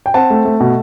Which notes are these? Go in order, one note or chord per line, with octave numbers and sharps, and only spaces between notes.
G5
C4 F#5 A5
A3
A3
B2